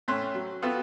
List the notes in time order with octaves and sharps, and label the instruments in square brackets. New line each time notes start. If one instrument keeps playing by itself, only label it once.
[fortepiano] A2 A3 C4 C#4 C6 F#6
F#3
B3 C4 F4 F#4 A4 A5